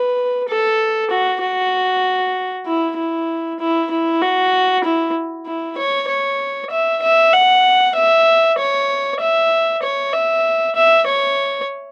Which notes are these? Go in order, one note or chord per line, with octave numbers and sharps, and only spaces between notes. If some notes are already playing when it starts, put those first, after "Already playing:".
Already playing: B4
A4
F#4
F#4
E4
E4
E4
E4
F#4
E4
E4
C#5
C#5
E5
E5
F#5
E5
C#5
E5
C#5
E5
E5
C#5